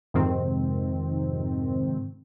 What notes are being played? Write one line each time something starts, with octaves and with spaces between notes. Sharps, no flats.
F2 G#2 C3 D#3 C4